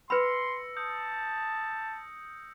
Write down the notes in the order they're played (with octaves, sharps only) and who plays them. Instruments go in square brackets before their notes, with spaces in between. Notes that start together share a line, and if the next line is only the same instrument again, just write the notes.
[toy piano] B4 B5 [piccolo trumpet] C6 [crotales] E6 A#6 C#7
[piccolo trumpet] A5 [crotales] D#6 G6 C#7